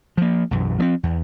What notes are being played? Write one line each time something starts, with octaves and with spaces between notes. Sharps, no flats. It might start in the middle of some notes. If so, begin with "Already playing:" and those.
F3 A#3
B1 F#2 E3
F3 A3 C4
E2